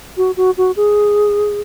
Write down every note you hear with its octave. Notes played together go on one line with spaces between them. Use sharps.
F#4
F#4
F#4
G#4